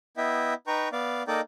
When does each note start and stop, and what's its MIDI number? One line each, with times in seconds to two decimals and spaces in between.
0.17 0.54 59
0.17 0.54 64
0.17 0.54 75
0.17 0.54 76
0.17 0.54 79
0.67 0.89 63
0.67 0.89 71
0.67 0.89 79
0.67 0.89 82
0.67 0.89 85
0.92 1.23 59
0.92 1.23 74
0.92 1.23 77
1.28 1.41 58
1.28 1.41 63
1.28 1.41 69
1.28 1.41 74
1.28 1.41 75
1.28 1.41 79